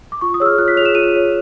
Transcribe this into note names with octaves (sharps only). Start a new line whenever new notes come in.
D6
F4 C#6
D#6
G#4 C#5 E6
F6
F4 F#6
B6
G#4 C#5 E7 F7
F4 D#7
G#4 C#5